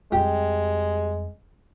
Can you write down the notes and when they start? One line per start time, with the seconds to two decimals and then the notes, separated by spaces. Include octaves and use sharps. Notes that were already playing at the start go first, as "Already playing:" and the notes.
0.12 F2 G3 G#3 G4